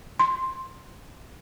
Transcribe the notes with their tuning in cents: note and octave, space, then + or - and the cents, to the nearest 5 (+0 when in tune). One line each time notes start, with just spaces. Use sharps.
C6 +10